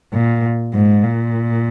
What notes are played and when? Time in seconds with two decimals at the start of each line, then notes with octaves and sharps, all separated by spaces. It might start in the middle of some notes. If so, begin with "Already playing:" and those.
0.13 A#2
0.74 G#2
1.04 A#2